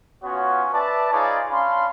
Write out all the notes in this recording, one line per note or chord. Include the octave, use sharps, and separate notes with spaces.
B3 C#4 F4 F#4 C#5
B4 D5 E5 A5
D#4 F4 G#4 B4 C#5 D5
C#4 D4 F5 B5 C6